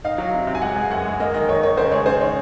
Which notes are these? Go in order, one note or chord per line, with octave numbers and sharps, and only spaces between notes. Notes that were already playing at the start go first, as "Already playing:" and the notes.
D#4 F5
F#3
C3
C3
G#5
G#3 F#5
G#3
F#2 F#5
G#3
A#3 D#5
D#3 D#5
D#3 C#5
D#3 C#5
C#3 C5
G#3 C#5
C#3 C5
D#4 C#5